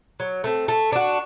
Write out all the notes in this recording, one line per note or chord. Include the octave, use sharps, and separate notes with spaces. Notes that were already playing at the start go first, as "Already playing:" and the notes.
F#3
A3 C4
A3
D4 F#4